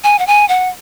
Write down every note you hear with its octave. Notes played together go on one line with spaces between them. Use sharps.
G#5
F#5
G#5
F#5